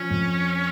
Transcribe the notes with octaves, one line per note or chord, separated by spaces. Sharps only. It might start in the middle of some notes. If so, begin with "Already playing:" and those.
Already playing: F3 C#4
F2